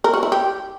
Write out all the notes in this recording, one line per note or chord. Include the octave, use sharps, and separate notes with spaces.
A#4
F#4
E4
G4